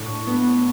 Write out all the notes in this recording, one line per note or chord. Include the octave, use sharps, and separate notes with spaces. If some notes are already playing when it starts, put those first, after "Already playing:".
Already playing: A2 D4 C#6
B3